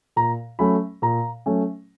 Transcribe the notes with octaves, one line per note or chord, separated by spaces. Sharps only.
A#2 A#5
F#3 A3 C#4 B5
A#2 A#5
F#3 A3 C#4